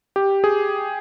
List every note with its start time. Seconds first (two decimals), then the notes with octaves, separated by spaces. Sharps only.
0.16 G4
0.44 G#4